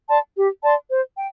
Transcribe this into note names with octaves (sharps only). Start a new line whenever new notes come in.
D5 A5 C6
G4
D5 A5 C6
C5
G5